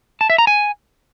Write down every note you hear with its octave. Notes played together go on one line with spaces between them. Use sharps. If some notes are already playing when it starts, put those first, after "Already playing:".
A5
E5
A#5
G#5